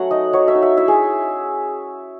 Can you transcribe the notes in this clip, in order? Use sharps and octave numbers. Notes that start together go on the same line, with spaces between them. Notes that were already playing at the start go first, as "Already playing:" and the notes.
Already playing: F#3 A3 C#4 C#5 F#5
D#4 D#5
F#3 C#5
E5
D#4
E5
E4 E5
G#4